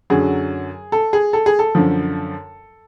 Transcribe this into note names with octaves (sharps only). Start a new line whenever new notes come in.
F#2 D3 F#3 G#4
A4
G#4
A4
G#4
A4
F#2 D3 F3